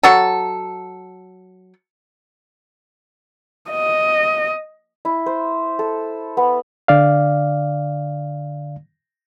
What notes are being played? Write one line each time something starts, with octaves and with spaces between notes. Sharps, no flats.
F#3 A4
D#5
E4
C5
A4
B3
D3 D5 F5